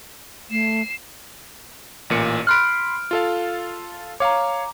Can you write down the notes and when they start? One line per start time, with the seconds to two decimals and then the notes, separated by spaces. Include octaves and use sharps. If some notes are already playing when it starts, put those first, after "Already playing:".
0.50 A3 C7 E7
2.10 A1 A#2 C#7
2.47 B5 C6 F6 F#6 D7
3.11 F4 A4 F5
4.20 C#5 F5 A#5 D6